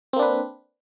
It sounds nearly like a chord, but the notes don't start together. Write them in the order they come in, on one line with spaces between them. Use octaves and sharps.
C4 A#3 D4 B4